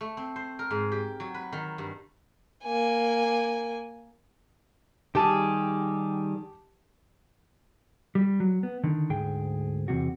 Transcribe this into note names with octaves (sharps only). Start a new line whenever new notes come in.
A3
C4
C5
A#4
G#2
G4
F#3
B4
D#3
G2
A#3 G#5
D#3 G3 G4 G#4 A5
G3
F#3
B3
D3 D#3
D2 G#2 G#4 G5
E2 C3 F#4